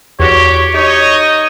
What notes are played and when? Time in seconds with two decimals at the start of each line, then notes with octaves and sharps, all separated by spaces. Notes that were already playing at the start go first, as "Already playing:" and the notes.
0.20 E2 F#4 G4 C#5 C#7
0.75 D#4 G4 C#5 D#5